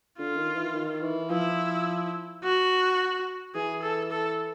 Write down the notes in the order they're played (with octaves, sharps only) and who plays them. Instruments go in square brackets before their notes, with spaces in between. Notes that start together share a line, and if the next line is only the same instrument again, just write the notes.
[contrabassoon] D3 [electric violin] F4
[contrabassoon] D#3
E3
D#3
E3
[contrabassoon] F3 [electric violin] E4
[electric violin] F#4
[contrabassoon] E3 [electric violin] G#4
[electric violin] A4
A4